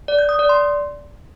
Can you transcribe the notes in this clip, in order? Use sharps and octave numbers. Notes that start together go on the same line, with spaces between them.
D5
G6
D#6
D5
C6